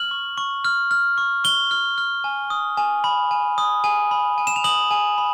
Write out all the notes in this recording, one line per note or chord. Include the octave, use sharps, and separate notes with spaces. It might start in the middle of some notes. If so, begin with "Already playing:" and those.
Already playing: F6 F#7
C#6
C#6
F6
F6
C#6
C#6 G7
F6
F6
G#5
D#6
G#5
B5
G#5
D#6
G#5
B5
G#5
E7
F7
D#6 F#7
G#5
B5